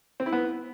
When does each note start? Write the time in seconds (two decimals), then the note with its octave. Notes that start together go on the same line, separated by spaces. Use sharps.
0.20 C4
0.26 E4
0.33 B3